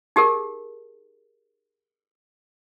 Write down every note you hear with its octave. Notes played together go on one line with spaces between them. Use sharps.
D#4 G4 G#4 A#4